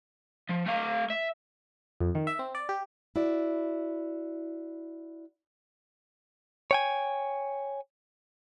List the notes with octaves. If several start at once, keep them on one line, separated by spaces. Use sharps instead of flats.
F3
A3 F5
E5
F2
D#3
E5
C4
D5
G4
E4 F#4 D5
C#5 G5 G#5